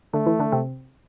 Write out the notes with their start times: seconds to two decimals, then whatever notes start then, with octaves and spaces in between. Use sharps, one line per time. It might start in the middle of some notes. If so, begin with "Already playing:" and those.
0.14 D3 A3 D4
0.26 E3 E4
0.40 D3 D4
0.52 C3 C4